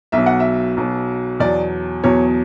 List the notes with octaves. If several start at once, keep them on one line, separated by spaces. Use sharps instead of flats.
B1 B2 F#3 E5
F#5
E5
B1 B2 F#3
E2 B2 F#3 D5
E2 B2 F#3 C#5